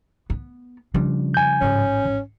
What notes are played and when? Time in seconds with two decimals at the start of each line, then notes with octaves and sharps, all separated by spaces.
0.30 B3
0.94 C#3 F3 G3 D4
1.34 G#5 G6
1.61 A1 G#2 C#4